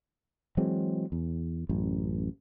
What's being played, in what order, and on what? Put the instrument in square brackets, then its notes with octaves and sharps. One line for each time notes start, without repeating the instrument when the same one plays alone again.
[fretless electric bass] E3 F#3 G#3 C4
E2
A1 F#2